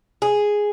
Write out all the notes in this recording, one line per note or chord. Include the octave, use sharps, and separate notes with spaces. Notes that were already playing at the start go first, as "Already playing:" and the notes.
G#4